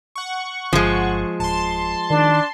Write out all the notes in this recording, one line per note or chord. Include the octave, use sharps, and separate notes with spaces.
F#5 C#6
G1 F3 G#3
D1 A5 C6
D#3 D4